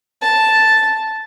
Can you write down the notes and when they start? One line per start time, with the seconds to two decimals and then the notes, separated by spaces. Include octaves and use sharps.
0.22 A5